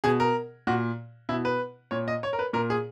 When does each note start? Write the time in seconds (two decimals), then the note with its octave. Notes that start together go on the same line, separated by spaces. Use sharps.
0.04 B2 G#4
0.20 A#4
0.67 A#2 F#4
1.29 B2 E4
1.45 B4
1.91 A#2 C#5
2.08 D#5
2.23 C#5
2.33 A#4
2.39 B4
2.53 A#2 A#4
2.70 G#4